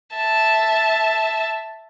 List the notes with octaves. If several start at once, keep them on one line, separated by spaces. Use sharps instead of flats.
E5 A5